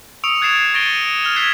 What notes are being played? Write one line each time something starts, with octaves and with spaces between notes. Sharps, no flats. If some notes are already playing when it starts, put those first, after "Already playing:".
C#6 D#6 E6 C#7 D7 F7
F#6 G#6 A6 C7 E7 F7
C#6 A6 A#6 D7 D#7 G7
F6 E7 G7
E6 F#6 G#6 B6 C7